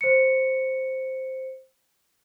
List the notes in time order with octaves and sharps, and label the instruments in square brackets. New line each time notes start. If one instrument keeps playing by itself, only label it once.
[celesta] C5 C#7